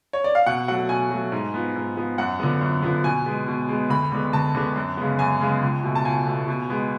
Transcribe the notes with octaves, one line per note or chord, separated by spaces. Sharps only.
C#5
D5
F5
B2 F#5
F#3 A3 F#5
B2 G#5
F#3 A3
G#2
F3 B3
G#2
F3 B3
F#2 F#5
D3 F3 B3
F#2
D3 F3 B3
B2 G#5
G#3 B3
B2
G#3 B3
D2 B5
D3 G#3 B3
D2 A5
D3 G#3 B3
F#2
C#3 G#3 B3
F#2 G#5
C#3 G#3 B3
C#2
B2 A3
A5
C#2 G#5
B2 A3
B2
G#3 B3